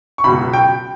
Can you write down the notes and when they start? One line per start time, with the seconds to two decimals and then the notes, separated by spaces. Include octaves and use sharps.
0.18 C#6
0.24 C#2 B2 F#3 B5
0.53 G5